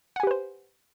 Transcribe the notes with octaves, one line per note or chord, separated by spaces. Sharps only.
G4 B4 C5 F#5 G#5